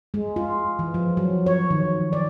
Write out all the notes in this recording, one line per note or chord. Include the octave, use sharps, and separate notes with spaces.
G#3
F4
E3
F3
F#3
C#5
D#3
D5